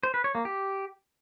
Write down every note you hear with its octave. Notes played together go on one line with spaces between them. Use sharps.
C5
B4
C#5
A#3
G4